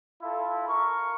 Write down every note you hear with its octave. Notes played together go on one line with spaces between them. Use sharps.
E4 F4 A4
A#4 C#6